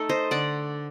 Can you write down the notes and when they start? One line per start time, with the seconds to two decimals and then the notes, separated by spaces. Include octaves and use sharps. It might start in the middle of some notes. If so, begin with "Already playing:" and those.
Already playing: A3 D#4 A4
0.09 C5 D#5
0.31 D3 D5 F#5